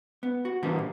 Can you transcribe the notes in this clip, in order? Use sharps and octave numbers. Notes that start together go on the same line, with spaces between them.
B3
F#4
E3 F3 G3 A#3 B3 D4
A#2